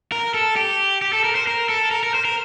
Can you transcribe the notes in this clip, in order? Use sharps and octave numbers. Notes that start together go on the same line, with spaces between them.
A#4
A4
G4
G4
A4
A#4
C5
A#4
A4
A#4
A#4
C5
A#4